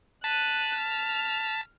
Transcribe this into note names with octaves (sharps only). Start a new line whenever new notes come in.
A5 F#6 B6 D#7
F6 F7